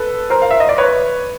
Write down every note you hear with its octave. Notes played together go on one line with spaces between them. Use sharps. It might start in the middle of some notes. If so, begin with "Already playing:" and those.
Already playing: A4 B4
A#4 C5
F5
E5
D#5
D5
B4 C#5